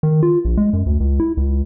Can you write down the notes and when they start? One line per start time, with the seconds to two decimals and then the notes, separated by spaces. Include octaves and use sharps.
0.03 D#3
0.23 F4
0.45 A#1
0.57 G#3
0.73 F#2
0.86 D2
1.00 C#2
1.20 E4
1.37 C#2